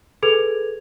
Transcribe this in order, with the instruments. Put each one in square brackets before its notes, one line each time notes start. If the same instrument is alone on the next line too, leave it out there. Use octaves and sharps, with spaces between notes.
[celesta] G#4 A4 B4 G#6 F7